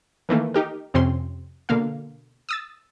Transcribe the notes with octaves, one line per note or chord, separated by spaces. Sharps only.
D#3 E3 A3 A#3
D#4 G4 A#4
F2 C3 C4 C#4 C6
B2 D3 A#3 F5
D#6 E6 A6